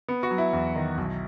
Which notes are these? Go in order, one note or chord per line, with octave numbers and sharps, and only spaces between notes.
B3
F#4
F#3
E4
E2
D#3
B1